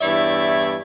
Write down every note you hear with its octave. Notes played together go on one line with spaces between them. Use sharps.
E2 G2 E4 C#5 D5 E5